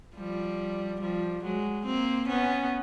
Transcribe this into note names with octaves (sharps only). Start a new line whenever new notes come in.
F3 G3
F3 G3
F#3 G#3
A#3 C4
B3 C#4